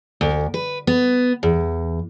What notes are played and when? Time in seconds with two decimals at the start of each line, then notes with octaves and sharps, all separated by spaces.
0.21 D2
0.54 B4
0.87 B3
1.43 E2